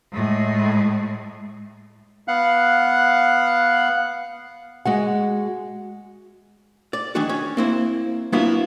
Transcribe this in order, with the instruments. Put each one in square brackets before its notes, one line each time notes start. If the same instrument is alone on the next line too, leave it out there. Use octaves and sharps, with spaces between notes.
[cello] A2 G#3
[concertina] B3 F5 F#5 F#6
[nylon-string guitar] G#3 F#4 F#5
[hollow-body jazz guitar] D5
D#3 E3 D4 F#4
C#4
A#3 C4 E4
F#3 A#3 B3 D4 E4 F4